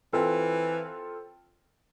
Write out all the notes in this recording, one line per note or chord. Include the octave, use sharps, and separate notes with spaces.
E3 C4 F4 A4